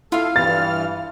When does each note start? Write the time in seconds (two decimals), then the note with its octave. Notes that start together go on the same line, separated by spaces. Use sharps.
0.12 E4 F4 A4 F5
0.36 G2 E3 F6 A6